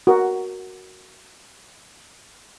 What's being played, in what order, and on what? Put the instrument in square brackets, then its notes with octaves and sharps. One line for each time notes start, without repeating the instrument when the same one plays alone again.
[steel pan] F#4 A#4